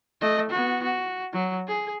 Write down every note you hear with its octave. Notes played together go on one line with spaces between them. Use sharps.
A3 D#5
B3 F#4
F#4
F#3
G#4